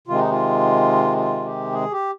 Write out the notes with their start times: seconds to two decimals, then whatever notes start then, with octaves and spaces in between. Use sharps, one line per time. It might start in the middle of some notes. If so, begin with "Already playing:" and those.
0.07 C3 D#3 G#3 F4
0.19 D#4
0.31 F4
1.17 F4
1.45 G4
1.73 G#4
1.92 G4